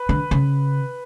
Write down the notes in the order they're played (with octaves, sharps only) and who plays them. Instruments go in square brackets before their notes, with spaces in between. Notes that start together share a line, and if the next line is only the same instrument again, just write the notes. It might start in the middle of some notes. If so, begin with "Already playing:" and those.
Already playing: [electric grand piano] B4
[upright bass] D3
C#3